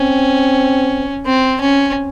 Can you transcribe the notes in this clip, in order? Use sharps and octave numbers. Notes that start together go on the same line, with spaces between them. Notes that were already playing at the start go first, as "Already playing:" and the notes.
Already playing: C4 C#4
C4
C#4